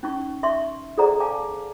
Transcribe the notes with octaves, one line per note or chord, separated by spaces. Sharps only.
C#4 D#4 C#6
E5 C6 C#6
G#4 A4 C5 D5 F#5 A#5
F5 G#5 A5 D6